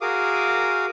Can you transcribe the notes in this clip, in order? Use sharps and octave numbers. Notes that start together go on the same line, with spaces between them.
F#4 G#4 A#4 F5 D6 D#6